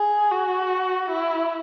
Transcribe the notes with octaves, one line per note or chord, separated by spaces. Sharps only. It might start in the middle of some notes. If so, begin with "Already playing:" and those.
Already playing: G#4
F#4
E4